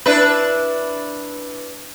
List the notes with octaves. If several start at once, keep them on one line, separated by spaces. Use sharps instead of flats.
D4 E4 B4